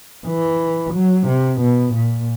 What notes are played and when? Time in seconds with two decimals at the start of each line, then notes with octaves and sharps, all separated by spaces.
0.26 E3
0.94 F#3
1.27 C3
1.61 B2
1.94 A#2